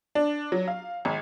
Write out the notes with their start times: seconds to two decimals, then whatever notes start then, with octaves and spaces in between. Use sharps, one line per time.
0.15 D4
0.52 F#3
0.68 F5
1.05 G#1